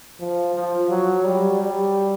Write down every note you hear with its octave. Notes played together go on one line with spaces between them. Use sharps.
F3
F3
F#3
G3
G3